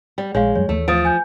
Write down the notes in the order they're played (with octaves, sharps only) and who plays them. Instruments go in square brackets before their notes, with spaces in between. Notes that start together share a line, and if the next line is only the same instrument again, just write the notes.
[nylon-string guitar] G3
[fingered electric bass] A#1 [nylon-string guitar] G#3 [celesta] C#5 F5
[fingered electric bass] F#2 F#3 G3 [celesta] C#5
[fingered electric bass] D#2 E3 [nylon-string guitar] A3
[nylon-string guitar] F3 [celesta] D#6 A6 D7
[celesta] G#5 G6